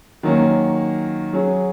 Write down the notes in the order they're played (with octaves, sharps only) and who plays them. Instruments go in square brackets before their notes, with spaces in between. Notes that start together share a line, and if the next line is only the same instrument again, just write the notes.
[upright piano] D#3 F#3 A#3 C#4
F#3 C#4 G#4